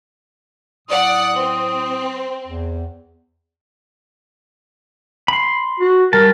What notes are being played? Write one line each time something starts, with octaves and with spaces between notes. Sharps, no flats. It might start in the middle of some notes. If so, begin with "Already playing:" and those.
A2 F#3 D5 F#5 D#6
C4
E2
B5 C6
F#4
G3 A#4 A5